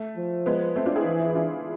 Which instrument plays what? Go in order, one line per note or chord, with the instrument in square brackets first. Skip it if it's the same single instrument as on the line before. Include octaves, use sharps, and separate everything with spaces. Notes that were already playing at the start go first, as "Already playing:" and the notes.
Already playing: [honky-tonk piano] A3
[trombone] F3
[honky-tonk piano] G#3 B3
A3 C4
D4 F4
E4 G#4
[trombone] E3
[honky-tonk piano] E4
D4 F4